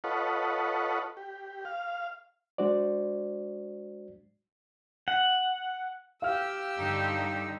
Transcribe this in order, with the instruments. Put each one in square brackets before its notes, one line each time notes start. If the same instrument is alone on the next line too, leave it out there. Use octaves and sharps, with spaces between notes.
[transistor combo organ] F4 A4 B4 C#5 D#5 F#5
G4
F5
[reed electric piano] G#3 D4 F#4 C5 D5
[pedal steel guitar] F#5
[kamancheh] G4 E6 [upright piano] F5 F6
[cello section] G2 D3 D#4